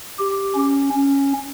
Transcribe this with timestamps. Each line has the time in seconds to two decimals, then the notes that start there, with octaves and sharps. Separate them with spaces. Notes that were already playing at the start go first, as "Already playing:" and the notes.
0.19 G4
0.55 C#4
0.94 C#4